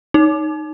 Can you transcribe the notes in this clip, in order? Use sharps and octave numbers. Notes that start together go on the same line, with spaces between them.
D#4